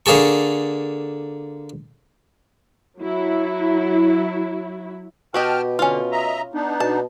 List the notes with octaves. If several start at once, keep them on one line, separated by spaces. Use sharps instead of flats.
D3 A#3 G#4 A4 C#6
F#3 E4
B2 F#4 G4 D#5 G5 A5 F6
D3 C#4 F4
D#5 E5 A#5
B3 D4 D#4
B2 A5